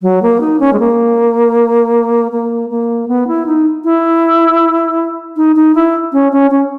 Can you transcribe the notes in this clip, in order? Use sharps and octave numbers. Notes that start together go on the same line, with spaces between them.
F#3
A#3
D#4
C#4
G#3
A#3
A#3
A#3
B3
E4
D#4
E4
D#4
D#4
E4
C#4
C#4
C#4